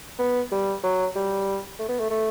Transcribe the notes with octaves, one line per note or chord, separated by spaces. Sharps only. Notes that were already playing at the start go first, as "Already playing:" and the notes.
B3
G3
F#3
G3
A3
B3
A3
A3